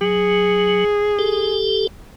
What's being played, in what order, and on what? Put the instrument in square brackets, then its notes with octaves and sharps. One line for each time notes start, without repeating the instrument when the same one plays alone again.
[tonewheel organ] F#3 [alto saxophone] G#4
[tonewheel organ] G4 A4